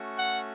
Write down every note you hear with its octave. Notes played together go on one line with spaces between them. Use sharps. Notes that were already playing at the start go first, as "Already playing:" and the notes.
Already playing: A3 C#4 F#4
F#5